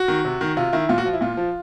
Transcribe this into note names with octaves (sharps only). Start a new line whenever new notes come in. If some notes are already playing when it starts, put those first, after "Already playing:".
Already playing: F#4
D#3
C3
D#3
C3 F4
D#3 E4
A#2 F4
F#4
F3 F4
E4
A#2 F4
F3